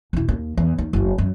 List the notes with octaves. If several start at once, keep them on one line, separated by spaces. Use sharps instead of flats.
E1 E4
D#2 A#3
E2
D#2
F#1 D2
F#2